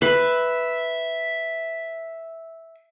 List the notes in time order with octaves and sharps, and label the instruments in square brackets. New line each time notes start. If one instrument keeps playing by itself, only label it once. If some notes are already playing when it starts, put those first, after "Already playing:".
[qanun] B4 [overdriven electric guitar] E5